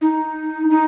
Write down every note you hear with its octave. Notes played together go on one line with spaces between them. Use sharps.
D#4
D#4